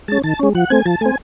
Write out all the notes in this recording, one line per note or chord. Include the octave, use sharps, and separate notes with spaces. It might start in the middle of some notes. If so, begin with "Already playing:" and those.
G#3 C#4 A5
D#3 A5
G#3 C#4
F3 F#5
A3 C4 G#5
F3 A5
A3 C4 G#5